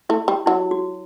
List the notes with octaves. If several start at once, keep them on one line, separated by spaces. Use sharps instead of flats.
A3 E4
G3 G4
F#3 E4
F#4